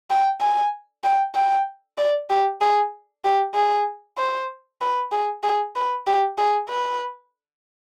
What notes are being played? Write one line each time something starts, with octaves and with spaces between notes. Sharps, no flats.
G5
G#5
G5
G5
D5
G4
G#4
G4
G#4
C5
B4
G#4
G#4
B4
G4
G#4
B4